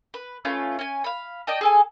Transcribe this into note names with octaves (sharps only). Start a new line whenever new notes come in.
B4
A3 C#4 F4 B4
C#4 G#5
F5 B5
D5 D#5 G5 A5
G#4 A4 G#5